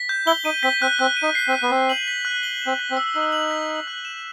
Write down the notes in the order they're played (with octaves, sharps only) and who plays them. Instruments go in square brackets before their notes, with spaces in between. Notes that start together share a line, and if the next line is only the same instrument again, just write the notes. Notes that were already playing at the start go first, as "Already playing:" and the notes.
Already playing: [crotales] B6
G6
[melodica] E4 [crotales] G7
[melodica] D#4 [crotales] D#7
[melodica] C4 [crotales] B6
[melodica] C4 [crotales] F#6
[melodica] C4 [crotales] F#6
[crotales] D#7
[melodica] D#4
[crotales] C7
[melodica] C4
[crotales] F#6
[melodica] B3
[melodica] C4 [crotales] F#6
[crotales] F#7
B6
F#6
G7
[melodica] C4 [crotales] E7
[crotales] B6
[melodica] C4
[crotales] E6
[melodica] D#4 [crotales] E6
[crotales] F#7
B6
E6
F#6
E7